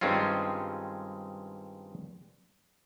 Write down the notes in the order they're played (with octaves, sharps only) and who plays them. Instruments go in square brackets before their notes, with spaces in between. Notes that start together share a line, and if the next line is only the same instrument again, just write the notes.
[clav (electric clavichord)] G2 D#3 G#3 C4 C#4 F4